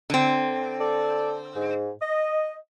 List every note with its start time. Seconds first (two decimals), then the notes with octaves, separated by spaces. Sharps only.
0.10 D3 C4
0.80 A4 D5
1.55 G#2
2.02 D#5